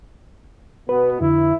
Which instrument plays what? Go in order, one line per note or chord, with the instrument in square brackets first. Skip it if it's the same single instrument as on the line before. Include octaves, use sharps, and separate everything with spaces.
[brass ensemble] B2 B3 [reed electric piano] B4
[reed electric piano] F2 D3 [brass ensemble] E4